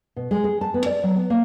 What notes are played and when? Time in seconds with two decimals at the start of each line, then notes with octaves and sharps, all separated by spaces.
0.16 B2
0.31 G#3
0.44 G#4
0.61 A5
0.74 B3
0.86 D5
1.03 F#3
1.16 B3
1.30 A#3